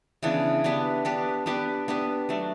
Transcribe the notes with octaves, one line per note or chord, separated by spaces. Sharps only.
C#3 E3 B3 D4
B3 D4 G4 B4
B3 D4 G4 B4
B3 D4 G4 B4
B3 D4 G4 B4
F#3 A3 D4